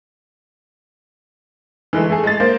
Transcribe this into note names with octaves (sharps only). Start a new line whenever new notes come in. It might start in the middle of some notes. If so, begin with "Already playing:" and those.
E3 G#3 A3
A3 G#4
G#3 A6
A#3 C5